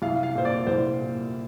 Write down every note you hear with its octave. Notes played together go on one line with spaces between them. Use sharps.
C2 F5
F5
A#2 C5
D5
C2 C5
A#2